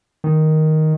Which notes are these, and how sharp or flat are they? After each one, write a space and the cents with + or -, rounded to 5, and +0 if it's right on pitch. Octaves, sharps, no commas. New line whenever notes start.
D#3 +5